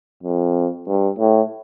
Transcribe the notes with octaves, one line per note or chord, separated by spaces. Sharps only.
F2
G2
A2